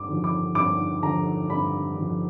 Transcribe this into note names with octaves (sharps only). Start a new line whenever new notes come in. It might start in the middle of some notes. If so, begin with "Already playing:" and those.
Already playing: G2 D6
D3 F3
D6
G2 D6
D3 F3 A#5
G2 B5
D3 F3